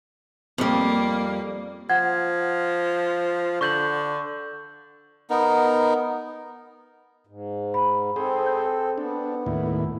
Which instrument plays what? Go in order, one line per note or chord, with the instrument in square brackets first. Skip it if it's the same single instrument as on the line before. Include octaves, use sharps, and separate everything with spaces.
[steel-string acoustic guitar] F2 G3 [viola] A#3
[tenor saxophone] F3 [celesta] F#5 [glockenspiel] G#6
[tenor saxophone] D3 [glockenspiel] C#6 G6 F#7
[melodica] B3 D#4 A#4
[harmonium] G#2
[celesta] B5
[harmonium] C4 A4 [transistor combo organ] G#4 C5
[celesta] G6
[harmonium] B3 [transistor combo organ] D4
[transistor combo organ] D#2 A2 E4